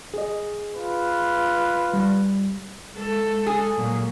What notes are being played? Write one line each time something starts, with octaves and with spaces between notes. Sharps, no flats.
G#4 D#5
F4 B4
G3
G#3 A4
G#4
A#2 F#3